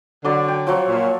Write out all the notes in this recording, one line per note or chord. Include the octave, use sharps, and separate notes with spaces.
D3 F#3 D5
G5
F3 F#3 C#5
A#2